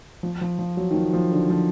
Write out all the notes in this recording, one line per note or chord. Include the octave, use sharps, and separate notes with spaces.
F3
F3
F3
F#3
D#3
F3
F3
D3
F3